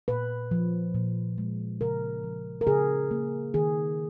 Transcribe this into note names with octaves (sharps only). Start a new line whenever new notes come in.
A#2 B4
F3
A#2
G#3
C#3 A#4
F3
A#4
C#3 G#4
A#3
D#3 G#4